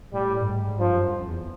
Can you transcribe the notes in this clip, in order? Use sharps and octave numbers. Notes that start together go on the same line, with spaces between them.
A2 G3
G2
G#2
G#2
G2 F3
F#2
F2
E2